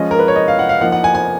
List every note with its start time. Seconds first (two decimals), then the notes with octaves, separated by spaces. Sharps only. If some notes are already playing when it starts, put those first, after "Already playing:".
Already playing: F3 G#3 C#4 D#5
0.11 A#4
0.19 B4
0.28 C#5
0.36 D#5
0.48 F5
0.59 F#5
0.69 F5
0.81 F3 A#3 D#4 F#5
0.92 F#5
1.04 G#5
1.14 G#5